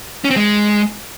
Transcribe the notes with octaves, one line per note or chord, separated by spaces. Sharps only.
C#4
C4
G#3